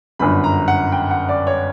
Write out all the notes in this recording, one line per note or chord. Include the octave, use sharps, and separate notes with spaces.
G1 F#2 D3 B5
A#5
F#5
G5
F#5
D5
C#5